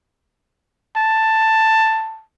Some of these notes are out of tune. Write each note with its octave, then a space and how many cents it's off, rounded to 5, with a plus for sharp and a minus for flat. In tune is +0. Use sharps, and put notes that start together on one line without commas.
A5 +10